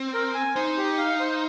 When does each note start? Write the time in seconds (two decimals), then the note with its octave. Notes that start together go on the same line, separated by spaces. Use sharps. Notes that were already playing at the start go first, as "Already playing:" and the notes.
Already playing: C4
0.14 A#4
0.34 G#5
0.55 D#4 C5
0.77 G4
0.98 F5
1.20 C5